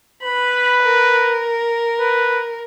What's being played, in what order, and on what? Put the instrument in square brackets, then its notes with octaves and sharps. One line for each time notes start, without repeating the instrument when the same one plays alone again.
[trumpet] B4 [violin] B5
[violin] A#4
[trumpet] B4